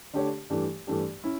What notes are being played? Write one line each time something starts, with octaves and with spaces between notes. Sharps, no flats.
D3 A3 D4 G4 C#5
G2 E3 A3 D4 G4
G2 E3 A3 D4 G4
C#4 E4